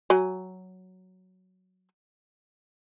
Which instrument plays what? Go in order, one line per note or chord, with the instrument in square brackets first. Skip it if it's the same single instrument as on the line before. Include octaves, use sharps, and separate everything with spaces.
[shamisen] F#3 G#5